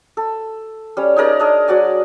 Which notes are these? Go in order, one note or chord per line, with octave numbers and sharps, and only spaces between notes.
A4
G3 C#4
D#4 G#4 A#4 D5
D4 G#4 D#5
F#3 F#4 D5 G#5